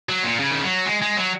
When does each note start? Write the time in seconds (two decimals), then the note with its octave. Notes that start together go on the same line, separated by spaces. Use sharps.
0.09 F#3
0.24 A#2
0.40 C#3
0.51 D#3
0.63 F#3
0.86 G#3
1.02 G#3
1.17 F#3